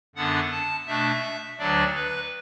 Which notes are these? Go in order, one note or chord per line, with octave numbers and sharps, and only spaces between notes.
F#2 D3 B3 D4 F#5
A5
B2 A3 D4 E5
D2 D3 F#3 D4 D5
B4